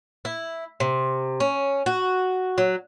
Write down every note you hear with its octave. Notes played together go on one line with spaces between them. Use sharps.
E4
C3
C#4
F#4
F#3